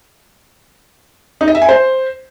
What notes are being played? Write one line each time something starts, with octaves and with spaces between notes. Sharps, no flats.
D#4
D#5
E5
G#5
C5